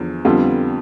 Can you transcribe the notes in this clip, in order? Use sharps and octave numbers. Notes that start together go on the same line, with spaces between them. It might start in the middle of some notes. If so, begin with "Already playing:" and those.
Already playing: E2 D3 F3
F2 D3 G3 B3 F4